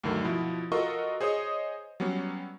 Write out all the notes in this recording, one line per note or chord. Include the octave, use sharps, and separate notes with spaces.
D2 G2 D3 D#3 F#3
B2 F3 E4
F4 F#4 A4 A#4 D#5 C#6
G#4 C5 C#5 D#5 D#6
F#3 G3 B3 C#4